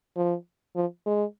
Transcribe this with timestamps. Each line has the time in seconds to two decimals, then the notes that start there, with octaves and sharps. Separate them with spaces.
0.16 F3
0.76 F3
1.06 G#3